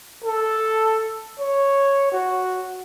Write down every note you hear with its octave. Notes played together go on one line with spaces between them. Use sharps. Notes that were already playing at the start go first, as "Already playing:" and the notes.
A4
C#5
F#4